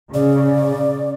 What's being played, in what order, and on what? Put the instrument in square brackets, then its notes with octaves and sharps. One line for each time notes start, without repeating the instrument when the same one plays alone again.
[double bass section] C#3 [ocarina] D5